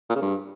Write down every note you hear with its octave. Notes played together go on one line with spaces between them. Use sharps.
A#2
C#3
G2